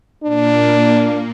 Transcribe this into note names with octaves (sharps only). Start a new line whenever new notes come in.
A#2 A#3 D4